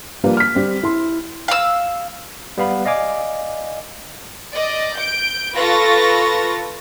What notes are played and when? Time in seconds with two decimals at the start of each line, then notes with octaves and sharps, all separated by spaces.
0.24 F3 G3 A#3 B4
0.37 F6 B6
0.55 G3 C4
0.83 E4 C6
1.48 F5 E6
2.58 G3 B3 F5 B5
2.85 D5 D#5 F5 G#5 D6
4.52 D5 D#5
4.97 G6 D7
5.53 F4 A4 B4 C#6 A6 A#6